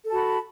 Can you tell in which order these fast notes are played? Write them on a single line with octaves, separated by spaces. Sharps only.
A4 A5 F#4 B5